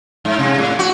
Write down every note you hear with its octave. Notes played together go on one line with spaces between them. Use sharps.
G#2
C3
A2
F#4